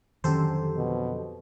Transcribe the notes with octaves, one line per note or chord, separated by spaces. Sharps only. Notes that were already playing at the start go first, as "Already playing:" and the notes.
F2 D3 D#3 F#3 C#4 G4 A4 C5
B2